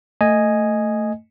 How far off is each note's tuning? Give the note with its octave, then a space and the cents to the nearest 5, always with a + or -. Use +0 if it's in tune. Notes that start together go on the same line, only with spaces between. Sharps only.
A3 +15 D#5 +0 G#5 +0